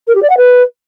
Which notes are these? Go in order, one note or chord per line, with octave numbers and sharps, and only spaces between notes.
A#4
G4
D5
F#5
B4